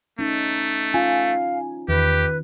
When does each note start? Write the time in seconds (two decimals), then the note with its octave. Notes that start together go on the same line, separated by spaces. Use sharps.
0.19 A3 C#4 D#4
0.94 C#4 F4 F5 G#5
1.89 E2 D#3 G4 B4